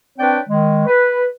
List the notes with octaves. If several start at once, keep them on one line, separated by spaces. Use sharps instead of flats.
C4 D4 B4 C#5 D5 G5
D#3 G#3
B4